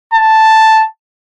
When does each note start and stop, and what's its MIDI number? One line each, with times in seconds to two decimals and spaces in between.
0.14 0.83 81